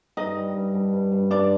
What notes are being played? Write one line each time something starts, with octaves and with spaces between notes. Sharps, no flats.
G2 D#4 D#5
G3
G2
G2
G2
G2
G2 D4 D5